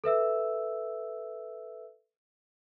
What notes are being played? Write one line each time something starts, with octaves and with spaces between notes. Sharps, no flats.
A4 B4 E5 E6